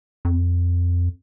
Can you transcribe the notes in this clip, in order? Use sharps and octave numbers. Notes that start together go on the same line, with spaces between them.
F2